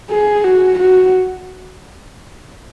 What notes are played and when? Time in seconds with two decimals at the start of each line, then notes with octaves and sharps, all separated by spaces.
0.10 G#4
0.44 F#4
0.79 F#4